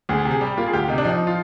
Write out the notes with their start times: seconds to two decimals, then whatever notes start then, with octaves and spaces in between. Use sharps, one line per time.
0.09 D2 G#4
0.25 C3
0.31 G#4
0.41 G3 G4
0.57 A#3 F4
0.67 G#4
0.73 D2 G4
0.88 C3 D#4
0.98 D4
1.04 F3 D#4
1.27 F4